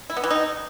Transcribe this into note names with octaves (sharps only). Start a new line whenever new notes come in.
E4
B3
E3
D#4